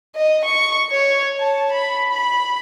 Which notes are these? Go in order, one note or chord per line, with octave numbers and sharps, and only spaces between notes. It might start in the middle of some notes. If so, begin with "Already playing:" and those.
D#5
C#6
C#5
A5
B5
B5